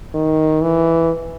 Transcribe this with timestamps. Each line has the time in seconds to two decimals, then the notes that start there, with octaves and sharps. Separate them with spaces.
0.14 D#3
0.62 E3